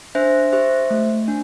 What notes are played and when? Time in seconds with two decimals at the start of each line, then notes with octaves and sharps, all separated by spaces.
0.15 D4 C5 E5
0.52 G4 C5 E5
0.91 A3
1.28 D4